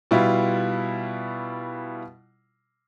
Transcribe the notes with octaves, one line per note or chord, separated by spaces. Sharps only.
B2 G3 E4 F4